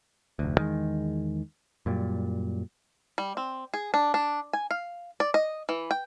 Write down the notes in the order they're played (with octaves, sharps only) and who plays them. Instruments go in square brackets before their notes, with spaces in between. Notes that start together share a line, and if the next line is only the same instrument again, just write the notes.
[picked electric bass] F1 D2
E2 D#3 G#3
F#2 A#2 G3
[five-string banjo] G3
C4
G#4
D4
D4
G#5
F5
D5
D#5
E3
G5